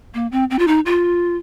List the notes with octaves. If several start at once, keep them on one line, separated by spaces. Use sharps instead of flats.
A#3
C4
C4
F4
D#4
F4